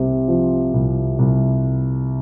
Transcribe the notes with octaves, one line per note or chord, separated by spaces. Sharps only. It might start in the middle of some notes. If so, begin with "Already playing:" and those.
Already playing: C2 C3
F3
C2
C2